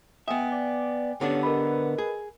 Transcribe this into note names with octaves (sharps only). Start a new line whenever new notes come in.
B3 D#5 E5 G5 G#5
D5
D3 B3 C#4 D4 G4
A#4 B4 D#5 B5
G#4